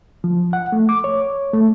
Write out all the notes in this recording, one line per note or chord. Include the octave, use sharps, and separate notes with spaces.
F3
F#5
A3
D6
C#5
A3